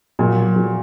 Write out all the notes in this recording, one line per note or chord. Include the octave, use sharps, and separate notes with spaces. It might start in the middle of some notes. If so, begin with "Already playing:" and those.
A#2 F#3
F#3